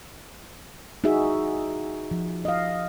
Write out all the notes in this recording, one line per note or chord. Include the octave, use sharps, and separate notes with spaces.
D#4 F#4 G#4 E5
F3
D#5 F5